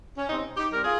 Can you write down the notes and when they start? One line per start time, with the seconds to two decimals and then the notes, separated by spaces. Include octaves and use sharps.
0.17 C#4
0.29 C3 C4 D#4
0.57 D#4 G4
0.71 G3 C4 A#4
0.84 F4 G#4